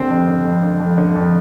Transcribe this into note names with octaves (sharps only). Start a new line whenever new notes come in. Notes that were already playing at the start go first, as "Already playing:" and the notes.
Already playing: G2 D3 C4
F2
D3
F2
D3
F2
D3
F2